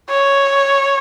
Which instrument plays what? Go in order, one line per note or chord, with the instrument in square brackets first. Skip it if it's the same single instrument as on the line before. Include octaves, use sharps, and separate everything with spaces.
[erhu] C#5